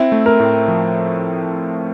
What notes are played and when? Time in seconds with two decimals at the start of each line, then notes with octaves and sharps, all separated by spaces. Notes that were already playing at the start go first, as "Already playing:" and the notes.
Already playing: C4 E4
0.12 A3
0.26 A#4
0.40 A2
0.68 F3